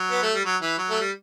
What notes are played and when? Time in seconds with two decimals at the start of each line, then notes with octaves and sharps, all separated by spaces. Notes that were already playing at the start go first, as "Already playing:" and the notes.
Already playing: F#3
0.11 B3
0.22 A3
0.34 G3
0.45 F#3
0.62 E3
0.78 F#3
0.90 A3
1.00 G3